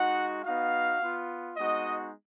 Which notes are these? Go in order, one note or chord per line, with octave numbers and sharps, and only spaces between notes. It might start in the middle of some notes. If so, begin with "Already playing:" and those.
Already playing: G#3 D#4 F#4 F#5
B3 D#4 F#4 F5
B3 F4
G#3 B3 D#4 F#4 D#5